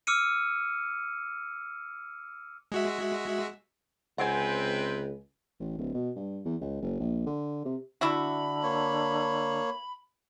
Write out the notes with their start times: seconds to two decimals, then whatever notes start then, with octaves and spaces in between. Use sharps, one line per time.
0.07 D6 E6 F6 C#7 D#7
2.72 G#3 F#4 E5
4.18 C#2 C3 C4 B4 F#5 G#5
5.60 A1
5.78 D1
5.94 B2
6.16 G2
6.45 E2
6.61 C#2
6.82 F#1
7.00 A#1
7.26 D3
7.65 C3
8.01 D3 D4 E4 F#4 B5
8.63 A#3 C#5